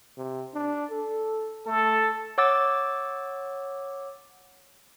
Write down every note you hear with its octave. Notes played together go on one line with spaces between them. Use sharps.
C3
D4
A4
A3 A4
C#5 F#5 D6 E6 A6